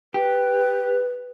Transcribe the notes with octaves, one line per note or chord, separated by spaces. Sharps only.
G4 B4